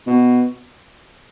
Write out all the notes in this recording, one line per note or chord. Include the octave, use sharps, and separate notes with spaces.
B2